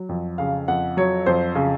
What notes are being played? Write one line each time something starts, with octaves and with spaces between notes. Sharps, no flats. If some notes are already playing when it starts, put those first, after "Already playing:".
Already playing: F#3
F2
C#3 F5
F2 F#5
F#3 C#5
F2 C5
C#3